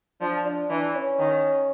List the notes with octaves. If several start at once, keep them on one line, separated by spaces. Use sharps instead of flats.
F3 D4
D4
E3 D4
C#4
D#3